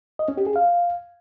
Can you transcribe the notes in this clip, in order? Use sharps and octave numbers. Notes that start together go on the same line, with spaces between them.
D#5
C#4
G4
G#4
F5